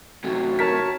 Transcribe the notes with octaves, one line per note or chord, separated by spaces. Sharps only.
F#2 C3 A3 F#4
A#4 C#5 A5 B6